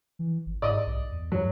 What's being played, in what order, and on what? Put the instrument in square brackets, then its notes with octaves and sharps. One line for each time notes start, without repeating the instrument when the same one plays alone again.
[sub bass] E3
G1
[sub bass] G#2 [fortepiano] D5 D#5
[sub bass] B1
E2
[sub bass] G2 [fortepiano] F#3